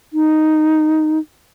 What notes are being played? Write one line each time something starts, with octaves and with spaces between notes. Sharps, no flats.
D#4